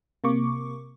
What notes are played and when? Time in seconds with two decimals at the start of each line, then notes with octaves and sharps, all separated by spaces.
0.24 C3 A#3 C#6 D6